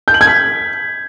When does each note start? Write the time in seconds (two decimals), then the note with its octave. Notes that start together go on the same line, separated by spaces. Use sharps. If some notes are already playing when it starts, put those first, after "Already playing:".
0.08 G6
0.14 F#7
0.21 G#6
0.27 B6